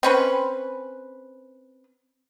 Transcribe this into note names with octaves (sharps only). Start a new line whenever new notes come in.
C4 C#4 B4